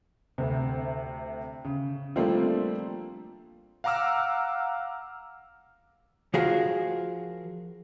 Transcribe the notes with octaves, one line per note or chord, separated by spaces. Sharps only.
D2 C3
C#3
F3 G3 A3 A#3 C4 D4
F5 F#5 A#5 D6 E6 F6
F3 F#4 G#4 A#4 F5